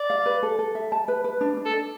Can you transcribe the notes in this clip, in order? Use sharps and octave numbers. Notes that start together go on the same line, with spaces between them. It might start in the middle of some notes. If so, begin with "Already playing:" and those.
Already playing: D5
F5
B4
A4
A4
E5
A5
B4
B4
D4
D4
A4
D4